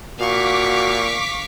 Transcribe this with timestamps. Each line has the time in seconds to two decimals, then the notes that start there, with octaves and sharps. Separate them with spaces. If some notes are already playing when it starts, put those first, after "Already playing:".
0.19 A#2 F#4 F5 C#6 D6 B6